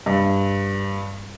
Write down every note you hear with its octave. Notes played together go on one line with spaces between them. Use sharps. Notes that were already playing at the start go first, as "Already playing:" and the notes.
G2